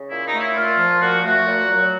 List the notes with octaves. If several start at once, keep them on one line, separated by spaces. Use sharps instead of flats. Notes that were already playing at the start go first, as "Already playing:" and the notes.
Already playing: C#3
A#2 E4
D#4
A3
E4
A#2 F4
F3
A#2 F#4
A3 F#4
A#2
F#3